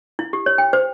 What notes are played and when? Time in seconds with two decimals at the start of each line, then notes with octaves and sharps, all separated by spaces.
0.19 E4
0.33 G4
0.46 C#5
0.58 G5
0.73 C5